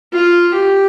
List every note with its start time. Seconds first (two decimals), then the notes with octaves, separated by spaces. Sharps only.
0.13 F4
0.54 G4